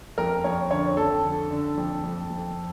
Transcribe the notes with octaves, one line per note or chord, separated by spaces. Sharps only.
F2 A#4
F2 C#5
D3 C#5
F2 A4
D3
D3
F2
F2
F2